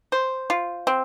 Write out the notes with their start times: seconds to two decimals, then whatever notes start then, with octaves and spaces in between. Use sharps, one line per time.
0.12 C5
0.50 F4
0.87 C4